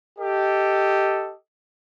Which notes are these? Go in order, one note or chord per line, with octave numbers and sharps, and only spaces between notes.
G4 A4 D#5